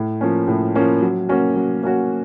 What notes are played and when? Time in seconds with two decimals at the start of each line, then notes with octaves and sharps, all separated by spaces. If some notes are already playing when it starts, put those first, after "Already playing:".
Already playing: A2
0.21 F3 A#3 C#4
0.48 A2
0.75 F3 A#3 C#4
1.02 F#3
1.29 A#3 C#4 F#4
1.56 F#3
1.83 A#3 C#4 F#4